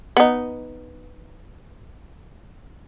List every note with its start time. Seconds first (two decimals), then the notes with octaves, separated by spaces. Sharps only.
0.17 B3 D#4